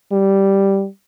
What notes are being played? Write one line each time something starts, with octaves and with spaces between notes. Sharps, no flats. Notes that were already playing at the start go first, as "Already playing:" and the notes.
G3